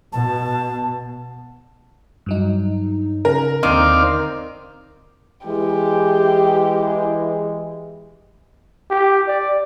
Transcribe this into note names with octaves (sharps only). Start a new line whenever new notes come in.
B2 A5
G2 F#3 D#4
C#3 A#4
D#2 D3 D#3 C4 D5 F5 C6
E3 G#3 G4
G4
D5